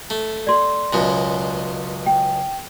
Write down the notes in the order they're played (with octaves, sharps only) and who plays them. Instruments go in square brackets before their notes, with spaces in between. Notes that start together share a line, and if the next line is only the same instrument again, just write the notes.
[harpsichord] A3
[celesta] D5 C6
[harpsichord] C#2 F#2 B2
[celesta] G5